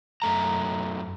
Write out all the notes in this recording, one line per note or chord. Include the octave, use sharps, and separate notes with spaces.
F#2 A3 A#5